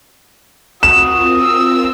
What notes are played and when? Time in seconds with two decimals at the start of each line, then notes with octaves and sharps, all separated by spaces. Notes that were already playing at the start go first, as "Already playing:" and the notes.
0.83 C4 F4 F#4 A#4 D#6 E7
1.39 E6